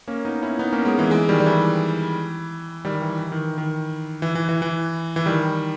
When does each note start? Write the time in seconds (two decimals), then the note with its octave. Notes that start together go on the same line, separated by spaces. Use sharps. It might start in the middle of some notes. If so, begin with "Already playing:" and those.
0.08 A#3 C#4
0.25 B3 D#4
0.42 C#4 E4
0.59 B3 D#4
0.73 A#3 C#4
0.85 G#3 B3
0.99 E3 G#3
1.11 E3 G#3
1.29 D#3 G3
1.40 G3
1.46 E3
2.85 D#3 G3
3.02 E3
3.19 E3
3.32 D#3
3.58 D#3
4.22 E3
4.35 E3
4.49 E3
4.62 E3
5.16 E3
5.26 D#3 G3